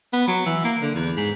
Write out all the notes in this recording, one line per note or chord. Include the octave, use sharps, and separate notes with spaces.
B3
F#3
E3
A#3
D3
E2
G#2